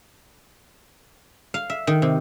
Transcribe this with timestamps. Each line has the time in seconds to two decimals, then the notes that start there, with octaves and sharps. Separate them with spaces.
1.54 F5
1.70 E5
1.87 D#3
2.02 C3